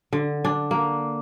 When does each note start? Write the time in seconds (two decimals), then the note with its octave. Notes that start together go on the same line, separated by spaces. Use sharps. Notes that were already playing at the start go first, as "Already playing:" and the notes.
0.13 D3
0.45 D4
0.71 A#3